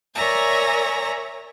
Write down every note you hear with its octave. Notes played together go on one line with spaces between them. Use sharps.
A#4 C#5 D5 E5 G#5 A#5